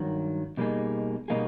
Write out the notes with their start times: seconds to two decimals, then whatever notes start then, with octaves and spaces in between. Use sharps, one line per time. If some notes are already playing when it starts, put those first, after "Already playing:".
Already playing: G2 D#3 F#3
0.57 B2 G3 A#3 D#4 G#4
1.28 B2 G3 A#3 D#4 G#4